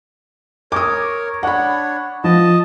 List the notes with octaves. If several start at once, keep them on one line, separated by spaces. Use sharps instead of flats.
A#4 C#5 D6 D#6
D4 C#5 F#5 B5
F3 D#5 A5